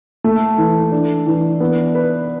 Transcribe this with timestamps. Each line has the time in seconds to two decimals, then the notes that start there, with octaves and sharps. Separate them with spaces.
0.24 A3
0.58 E3
0.92 D4
1.27 E3
1.60 B3
1.95 B4